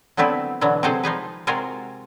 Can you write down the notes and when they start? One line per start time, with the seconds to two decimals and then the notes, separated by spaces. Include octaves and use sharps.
0.17 D3 F#3 A3 B3 C4 E4
0.61 B2 D3 E3 F#3
0.83 C3 F#3 G#3 G#4 A4 C5
1.03 F3 D#4 G#4 B4
1.47 C3 G#3 F4 F#4 G#4 A#4